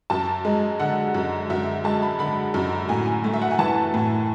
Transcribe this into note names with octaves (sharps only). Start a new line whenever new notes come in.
F#2 A5
G#3
D3 F#5
F#2
F#2 E5
G#3 A5
B5
D3 B5
F#2
A2 G#5
A3
E5
F#5
G#5
E3 A5
A2